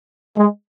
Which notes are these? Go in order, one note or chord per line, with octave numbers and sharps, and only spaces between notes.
G#3